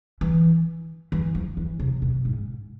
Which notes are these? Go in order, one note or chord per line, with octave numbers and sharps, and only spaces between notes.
E3
E3
F3
E3
C3
B2
G#2